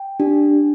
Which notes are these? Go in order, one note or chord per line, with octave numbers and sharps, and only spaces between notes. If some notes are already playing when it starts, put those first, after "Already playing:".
Already playing: G5
D4 G4